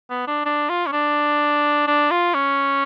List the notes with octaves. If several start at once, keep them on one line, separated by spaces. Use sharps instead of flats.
B3
D4
D4
F4
C#4
D4
D4
F4
C#4